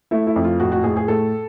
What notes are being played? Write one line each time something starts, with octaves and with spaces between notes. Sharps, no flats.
A3 E4
E4
F2
F4
A2 F#4
F#4
A2 G#4
G#4
A2 A4